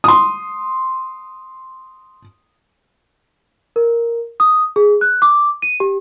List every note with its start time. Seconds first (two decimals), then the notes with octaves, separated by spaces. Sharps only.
0.04 C6 D#6
3.76 A#4
4.40 D#6
4.76 G#4
5.01 F#6
5.22 D6
5.62 D#7
5.80 G4